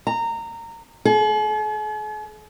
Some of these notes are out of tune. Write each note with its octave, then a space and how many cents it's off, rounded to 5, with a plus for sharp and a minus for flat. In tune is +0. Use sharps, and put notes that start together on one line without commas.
A#5 -20
G#4 +45